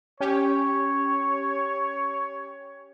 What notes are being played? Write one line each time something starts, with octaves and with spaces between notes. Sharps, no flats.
C#4 G4 C#5